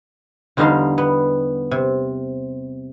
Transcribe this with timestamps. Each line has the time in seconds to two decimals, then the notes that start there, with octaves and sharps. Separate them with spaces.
0.57 E2 D3 G3 D#4 F5 C6
0.98 B3
1.71 C3